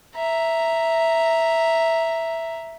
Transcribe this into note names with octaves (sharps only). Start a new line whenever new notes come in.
E5 A#5